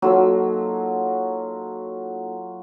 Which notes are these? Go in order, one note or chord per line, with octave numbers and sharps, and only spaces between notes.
F#3 A#3 D#4 F4 A4 E6